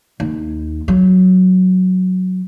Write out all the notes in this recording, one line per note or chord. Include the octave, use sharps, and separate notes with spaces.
D#2
F#3